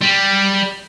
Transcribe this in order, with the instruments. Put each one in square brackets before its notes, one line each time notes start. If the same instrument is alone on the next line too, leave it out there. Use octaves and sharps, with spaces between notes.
[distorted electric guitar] G3